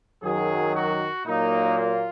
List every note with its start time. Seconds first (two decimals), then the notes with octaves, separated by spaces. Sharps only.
0.22 F#2 D#3 F#3 G#4
0.74 F#4
1.25 A#2 F#3 A#3 D#4
1.77 F4